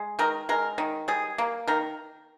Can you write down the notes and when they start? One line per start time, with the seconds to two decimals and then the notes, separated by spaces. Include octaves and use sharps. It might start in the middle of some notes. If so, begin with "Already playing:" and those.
Already playing: G#3
0.19 D#3 A#4
0.49 G#3 A#4
0.78 D#3
1.08 G3 G#4
1.38 A#3
1.68 D#3 A#4